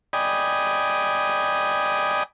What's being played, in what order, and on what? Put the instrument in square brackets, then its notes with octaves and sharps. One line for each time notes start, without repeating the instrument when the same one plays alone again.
[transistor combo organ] D5 D#5 G5 G#5 B5 D#6